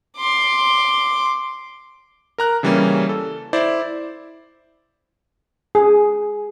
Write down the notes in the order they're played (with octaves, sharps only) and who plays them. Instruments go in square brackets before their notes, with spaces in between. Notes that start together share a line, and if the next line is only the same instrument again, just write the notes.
[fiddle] C6 D6
[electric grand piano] A#4 A#5 F#6
C#3 E3 G3 A#3 C#4
A4
E4 C5 D5
[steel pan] G#4